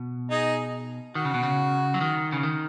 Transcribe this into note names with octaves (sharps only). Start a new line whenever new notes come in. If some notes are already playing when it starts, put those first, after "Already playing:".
Already playing: B2
D#4 G#4
D#3 F#4
C#3
B2
C#3
F#3
D#3
C#3
D#3